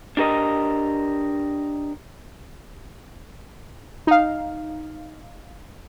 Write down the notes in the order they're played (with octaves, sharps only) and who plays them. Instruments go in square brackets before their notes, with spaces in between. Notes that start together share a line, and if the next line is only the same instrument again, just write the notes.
[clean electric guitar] D4 G4 A#4 D#5
[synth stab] D#4 F5